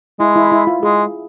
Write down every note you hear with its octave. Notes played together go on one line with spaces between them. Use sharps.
G#3 E4
E4
E4
F4
G#3 G#4